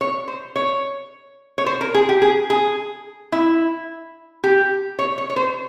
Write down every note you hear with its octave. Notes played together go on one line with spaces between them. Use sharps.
C#5
C5
C#5
C#5
C5
A#4
G#4
G4
G#4
G#4
E4
G4
C#5
C#5
C#5
C5